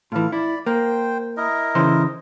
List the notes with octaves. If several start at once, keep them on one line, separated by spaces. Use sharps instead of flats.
A2 E3 F4
E4 D5 B5
A#3 C5 G5
E4 A#4 D#5
C#3 E3 C5